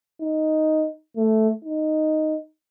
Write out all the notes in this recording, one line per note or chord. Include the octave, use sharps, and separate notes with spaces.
D#4
A3
D#4